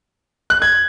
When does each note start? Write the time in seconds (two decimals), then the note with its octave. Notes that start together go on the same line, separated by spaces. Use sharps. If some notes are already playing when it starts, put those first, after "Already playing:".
0.50 F#6
0.62 G#6